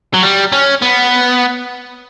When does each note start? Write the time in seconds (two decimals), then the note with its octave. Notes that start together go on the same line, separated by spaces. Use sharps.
0.14 F#3
0.23 G3
0.53 C#4
0.82 B3